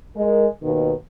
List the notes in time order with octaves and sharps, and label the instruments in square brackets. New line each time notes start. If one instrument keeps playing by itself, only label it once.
[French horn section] G#3 A#4
D#2 B2 D#3 B4